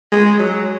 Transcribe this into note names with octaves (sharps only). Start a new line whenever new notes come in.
G#3
F#3